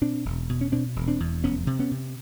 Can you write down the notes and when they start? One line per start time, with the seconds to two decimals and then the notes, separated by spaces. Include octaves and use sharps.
0.01 B2 C4 D4
0.25 E1
0.49 B2
0.61 C#4
0.72 B2 C4 D4
0.96 E1
1.08 C4 D4
1.20 E2
1.44 F1 B3 C#4
1.67 C3
1.79 B3 C#4
1.91 C3